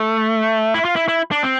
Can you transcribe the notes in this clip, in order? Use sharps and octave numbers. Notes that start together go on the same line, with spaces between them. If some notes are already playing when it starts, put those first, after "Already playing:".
Already playing: A3
E4
F4
E4
E4
D4
C4